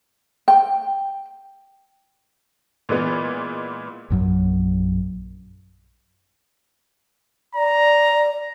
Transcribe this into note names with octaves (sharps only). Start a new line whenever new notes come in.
G5
A#2 E3 G#3 B3
A#1 F#2 F#3
D5 A#5